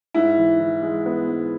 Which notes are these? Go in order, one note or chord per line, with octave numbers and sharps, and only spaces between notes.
G#2 E4
E3
E3
G#3
B3
G#2